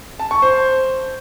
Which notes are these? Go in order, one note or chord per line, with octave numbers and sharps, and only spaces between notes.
A5
C#6
C5